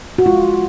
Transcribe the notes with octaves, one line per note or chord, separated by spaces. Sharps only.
F#4
G#3 F4